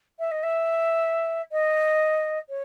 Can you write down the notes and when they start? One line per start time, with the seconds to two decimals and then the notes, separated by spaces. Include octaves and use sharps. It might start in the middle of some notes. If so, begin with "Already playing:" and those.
0.19 E5
0.31 D#5
0.43 E5
1.52 D#5
2.49 C#5